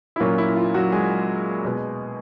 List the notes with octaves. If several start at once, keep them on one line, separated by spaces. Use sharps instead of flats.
E4
A#2 F#3 A#3 C#4 F4
E4
F4
F#3 F#4
G#3 G#4
B2 G#3 B3